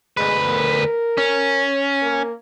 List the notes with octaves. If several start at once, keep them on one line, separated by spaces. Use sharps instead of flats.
D2 G#3 B4
A#4
C#4
A#3